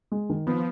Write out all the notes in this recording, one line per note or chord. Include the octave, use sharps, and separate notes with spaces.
G#3
D#3
F3 B3